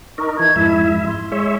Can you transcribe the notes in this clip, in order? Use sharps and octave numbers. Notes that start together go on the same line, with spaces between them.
D#4 A#4 C#6
E3 D#5 A5 G#6
F2 G#2 E4 E5
C6
G#3 C#5 E5